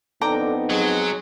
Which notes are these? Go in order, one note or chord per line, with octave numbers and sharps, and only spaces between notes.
F2 D3 B3 D#4 G5 A#5 D6
F#3 G#3